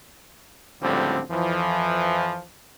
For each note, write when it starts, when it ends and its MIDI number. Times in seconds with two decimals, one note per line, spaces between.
0.82 1.22 37
0.82 1.22 45
0.82 1.22 50
0.82 1.22 53
0.82 1.22 55
0.82 1.22 60
1.30 2.42 41
1.30 2.42 52
1.30 2.42 53